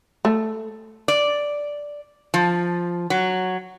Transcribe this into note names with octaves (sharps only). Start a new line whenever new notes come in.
A3
D5
F3
F#3